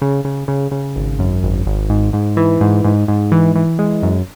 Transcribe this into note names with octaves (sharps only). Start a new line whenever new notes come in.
C#3
C#3
C#3
C#3
G#1
F#2
G#1
G#1
G#2
G#2
E3
G#2
G#2
G#2
E3
E3
G#3
F#2